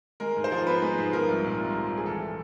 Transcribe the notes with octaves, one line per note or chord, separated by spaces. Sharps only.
G#3 A#4
G#2
C5
F3
B3 B4
G#3
G#2
F3 A#4
C2
A#2
C2
F3
C2
G#4
E3 A4